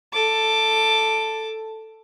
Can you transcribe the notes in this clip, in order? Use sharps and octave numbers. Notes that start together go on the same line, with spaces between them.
A4 D6